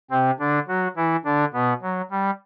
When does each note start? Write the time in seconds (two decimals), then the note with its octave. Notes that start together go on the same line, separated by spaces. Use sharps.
0.11 C3 C4
0.39 D3 D4
0.68 F#3 F#4
0.96 E3 E4
1.25 D3 D4
1.54 B2 B3
1.82 F#3
2.11 G3